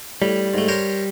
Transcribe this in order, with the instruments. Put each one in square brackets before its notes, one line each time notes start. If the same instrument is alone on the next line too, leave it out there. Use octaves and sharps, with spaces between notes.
[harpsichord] A2 [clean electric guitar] G3
[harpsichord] G#2 A3
A#4 C5 C#5